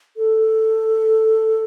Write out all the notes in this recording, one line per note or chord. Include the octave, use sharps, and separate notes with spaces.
A4